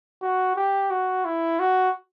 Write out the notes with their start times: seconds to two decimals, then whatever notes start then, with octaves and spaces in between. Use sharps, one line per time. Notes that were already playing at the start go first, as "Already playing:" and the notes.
0.22 F#4
0.56 G4
0.91 F#4
1.25 E4
1.60 F#4